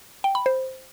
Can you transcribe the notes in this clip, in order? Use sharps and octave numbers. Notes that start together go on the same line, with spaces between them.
G5
B5
C5